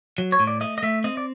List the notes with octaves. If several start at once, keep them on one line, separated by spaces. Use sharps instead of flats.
F#3
C#5
A2
D5
A3 D#5
D#5
A3 E5
C4 D#5
D5